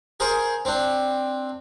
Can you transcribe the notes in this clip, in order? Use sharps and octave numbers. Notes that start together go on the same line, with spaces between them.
G#4 A#4 C5
C4 D4